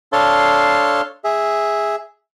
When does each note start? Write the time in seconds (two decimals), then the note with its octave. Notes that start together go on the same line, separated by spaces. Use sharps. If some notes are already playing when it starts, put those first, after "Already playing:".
0.13 D4 A4 C#5 F5 A5 C6
1.24 G#4 E5